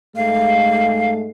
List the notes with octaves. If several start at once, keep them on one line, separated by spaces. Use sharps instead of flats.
G#2 G#3 A3 F5